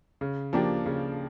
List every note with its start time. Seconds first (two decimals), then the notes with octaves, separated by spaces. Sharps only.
0.21 C#3
0.53 F3 A#3 D4 G4
0.86 C#3